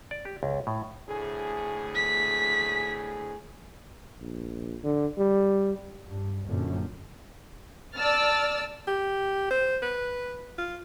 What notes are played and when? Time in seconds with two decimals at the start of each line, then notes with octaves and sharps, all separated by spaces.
0.11 D5
0.25 G4
0.43 C#2
0.67 A2
1.08 D2 A2 G#4
1.95 B6
4.19 A#1
4.83 D3
5.18 G3
6.08 G2
6.47 A#1 F#2 D3
7.95 D5 A5 E6 F6 A6
8.88 G4
9.51 C5
9.82 B4
10.58 F4